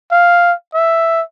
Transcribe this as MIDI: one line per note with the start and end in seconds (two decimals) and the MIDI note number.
0.11 0.53 77
0.74 1.22 76